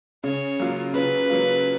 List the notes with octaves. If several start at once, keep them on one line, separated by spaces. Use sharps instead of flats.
C#3 C#5
F#3 A#3 F4
C#3 B4
F#3 A#3 F4